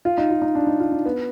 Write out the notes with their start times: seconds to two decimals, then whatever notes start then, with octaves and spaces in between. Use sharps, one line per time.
0.05 F4
0.18 D#4
0.30 F4
0.42 D#4
0.55 D4
0.67 D#4
0.80 F4
0.92 D4
1.05 B3